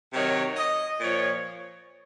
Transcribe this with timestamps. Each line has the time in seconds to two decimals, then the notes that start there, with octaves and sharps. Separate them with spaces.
0.13 C3 D#3 F#3 C#5
0.57 D#5
1.00 A#2 F3 C#5